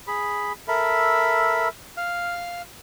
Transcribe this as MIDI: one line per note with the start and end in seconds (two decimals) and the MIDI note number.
0.07 0.53 68
0.07 0.53 83
0.68 1.68 69
0.68 1.68 70
0.68 1.68 76
0.68 1.68 83
1.97 2.62 77
1.97 2.62 89